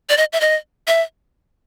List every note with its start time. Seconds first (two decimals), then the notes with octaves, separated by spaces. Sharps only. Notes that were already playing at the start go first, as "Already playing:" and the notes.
0.10 D5
0.17 D#5
0.33 E5
0.41 D#5
0.87 E5